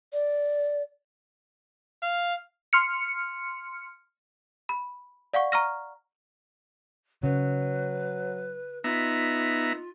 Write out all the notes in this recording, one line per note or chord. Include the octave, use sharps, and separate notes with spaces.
D5
F5
C6 F6 C#7
B5
D5 F5 F#5 C#6
A#5 C#6 F6 A#6
C#3 F#3 B4
B3 D#4 F4 E5 A#5